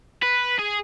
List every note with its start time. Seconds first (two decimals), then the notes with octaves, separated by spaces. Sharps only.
0.22 B4
0.59 G#4